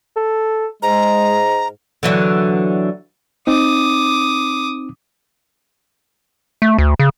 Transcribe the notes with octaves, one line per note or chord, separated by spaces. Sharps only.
A4
G#2 G#3 A#5
D3 E3 F#3
C4 D#4 D6 D#6
A3
D2
C#3